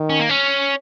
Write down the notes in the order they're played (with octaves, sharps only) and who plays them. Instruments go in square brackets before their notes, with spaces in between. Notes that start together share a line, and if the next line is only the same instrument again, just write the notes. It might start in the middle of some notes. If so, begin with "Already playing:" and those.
Already playing: [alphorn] D#3
[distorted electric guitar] C#4
A#3
C#4